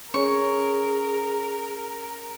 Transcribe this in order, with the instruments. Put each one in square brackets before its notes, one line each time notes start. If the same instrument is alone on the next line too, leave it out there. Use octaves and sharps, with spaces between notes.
[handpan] C#4 C#5 [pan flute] G#4 [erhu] A#4 [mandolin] C#6